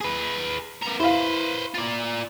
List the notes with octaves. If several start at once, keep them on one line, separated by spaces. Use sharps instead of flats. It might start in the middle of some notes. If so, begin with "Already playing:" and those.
G#4 B4
B3 A#4
E4 B4 C5 F5
F4 D5